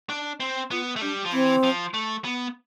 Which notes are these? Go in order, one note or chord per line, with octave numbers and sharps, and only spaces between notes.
D4
C4
B3 F4
A3
G3 D4
F3
E3 C4
F3
A3
B3